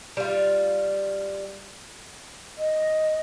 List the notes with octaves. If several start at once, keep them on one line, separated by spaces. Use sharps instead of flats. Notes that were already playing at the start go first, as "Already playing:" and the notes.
G3 F4
D#5